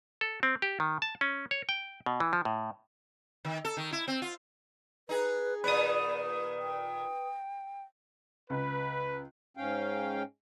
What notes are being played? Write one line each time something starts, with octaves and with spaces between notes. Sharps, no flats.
A4
C4
G4
D#3
A5
C#4
C#5
G5
B2
E3
F3
A2
D#3
A4
D#3
E4
C4
F4
D#4 G#4 B4
A#2 D#3 B3 B4 D5 D#6
G5
C#2 B4
G#2 C#4 F5 G5